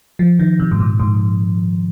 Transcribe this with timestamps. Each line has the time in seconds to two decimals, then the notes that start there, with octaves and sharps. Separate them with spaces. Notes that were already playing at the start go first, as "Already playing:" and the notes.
0.19 F3
0.39 D#3
0.59 C3
0.71 G#2
0.80 A#2
1.00 G#2